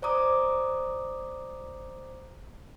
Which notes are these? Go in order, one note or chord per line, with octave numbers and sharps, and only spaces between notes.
C5 D5 A#5 D6 D#6